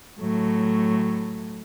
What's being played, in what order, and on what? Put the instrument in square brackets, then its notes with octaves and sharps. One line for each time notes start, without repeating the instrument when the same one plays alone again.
[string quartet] A2 F#3 A3